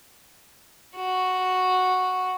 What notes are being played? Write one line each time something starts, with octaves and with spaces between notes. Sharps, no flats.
F#4